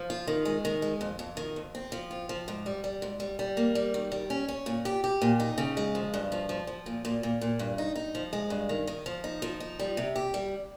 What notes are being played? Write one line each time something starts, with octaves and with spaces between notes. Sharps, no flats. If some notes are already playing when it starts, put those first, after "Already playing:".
Already playing: F3
F4
D#3
G#3
D#3
G#3
F2
F2
D#3
F2
C4
F3
F4
F3
G#2
G3
G3
G#2
G3
G3
A#3
G3
D#3
G3
C#4
C#4
A#2
G4
G4
A#2
D#4
C#3
G#3
F3
G2
F3
F3
F3
A#2
A#2
A#2
A#2
G2
D#4
D#4
F3
G#3
G2
D#3
D#3
F3
D#4
F3
D#4
G3
C3
G4
G3